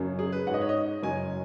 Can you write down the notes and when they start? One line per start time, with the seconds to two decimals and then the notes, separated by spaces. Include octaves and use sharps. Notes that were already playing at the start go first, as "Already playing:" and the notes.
Already playing: F#1 F#2 C#3 F#3 C#4
0.19 G#4
0.32 B4
0.47 G#2 G#3 C#4 F#5
0.54 D#5
0.61 C#5
0.69 D#5
1.02 F#1 F#2 F#3 C#4 G#5